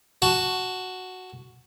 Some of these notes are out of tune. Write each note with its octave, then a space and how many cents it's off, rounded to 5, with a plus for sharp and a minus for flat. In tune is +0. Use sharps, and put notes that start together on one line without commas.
F#4 +0 A5 +0